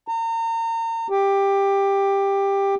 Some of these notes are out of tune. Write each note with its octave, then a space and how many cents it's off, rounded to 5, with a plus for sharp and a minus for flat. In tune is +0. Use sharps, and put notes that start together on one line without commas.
A#5 -35
G4 +15